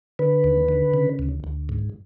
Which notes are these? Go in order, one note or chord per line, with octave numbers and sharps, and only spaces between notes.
D3 B4
D#2
D3
C#3
D2
D2
G#2